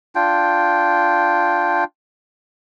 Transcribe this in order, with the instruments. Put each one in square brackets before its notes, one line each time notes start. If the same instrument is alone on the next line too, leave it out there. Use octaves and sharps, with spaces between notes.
[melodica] D4 F4 G5